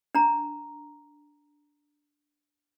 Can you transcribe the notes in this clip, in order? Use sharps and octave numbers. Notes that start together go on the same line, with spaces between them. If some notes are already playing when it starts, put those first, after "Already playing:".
D4 A#5